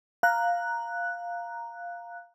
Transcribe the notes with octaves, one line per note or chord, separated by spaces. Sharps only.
F5 A#5 F#6